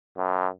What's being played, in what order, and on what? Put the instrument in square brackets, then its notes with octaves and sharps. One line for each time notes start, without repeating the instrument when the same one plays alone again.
[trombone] F#2